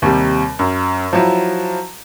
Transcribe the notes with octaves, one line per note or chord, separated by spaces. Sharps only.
D#2 C3 G3
F#2
F3 F#3 E4